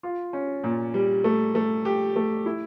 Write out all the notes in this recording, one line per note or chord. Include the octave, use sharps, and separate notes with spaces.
F4
C#4
A#2
G3
A3
A3
G4
A3
E4